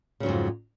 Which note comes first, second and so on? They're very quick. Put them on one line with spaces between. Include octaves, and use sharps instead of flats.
C#3 F#3 G#2 F2